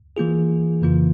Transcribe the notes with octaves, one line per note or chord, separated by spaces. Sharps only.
E3 A#3 F4 G#4
F2 C#3 E3 A#3 F4